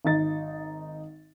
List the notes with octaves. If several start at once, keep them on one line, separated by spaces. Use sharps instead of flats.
G#1 D#4 A6